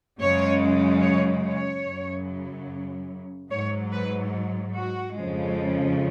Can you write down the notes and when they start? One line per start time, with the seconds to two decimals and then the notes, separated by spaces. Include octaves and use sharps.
0.20 F#2 C#3 G#3 C#5
1.02 C#5
1.44 C#5
1.85 F#2 C#3 F#3
3.50 G#2 F#3 C#5
3.92 B4
4.76 F#4
5.17 F2 C#3 F3 G#3